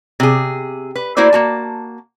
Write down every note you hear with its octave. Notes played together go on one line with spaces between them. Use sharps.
C3 G#4
B4
A3 A#3 E4 F#4 C5 D5
A#3 F#4 A5